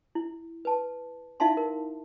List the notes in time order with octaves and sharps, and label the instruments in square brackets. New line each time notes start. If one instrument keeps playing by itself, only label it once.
[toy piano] E4
B4 A5
D#4 E4 E5 F5 A5 C6
A#4